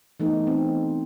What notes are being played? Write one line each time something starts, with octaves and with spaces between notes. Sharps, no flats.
E3 A3 B3 D#4 A4
C4